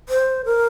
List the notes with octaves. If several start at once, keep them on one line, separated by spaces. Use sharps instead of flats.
C5
A#4